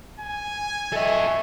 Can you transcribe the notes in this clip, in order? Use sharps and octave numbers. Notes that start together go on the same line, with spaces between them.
G#5
A4 D#5 E5 C#6